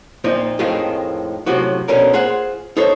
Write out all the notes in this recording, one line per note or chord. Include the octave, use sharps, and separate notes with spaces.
A#2 F3 C4 D#4
F2 A2 D#3 G#3 C4 F4
F#2 A2 C3 F3 F#4
G#2 B2 D3 C#4 A#4
F4 G#4 C5 F#5
D#4 A4 C5 C#5